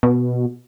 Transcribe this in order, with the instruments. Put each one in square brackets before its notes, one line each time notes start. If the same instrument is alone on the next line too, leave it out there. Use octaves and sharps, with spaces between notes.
[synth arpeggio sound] B2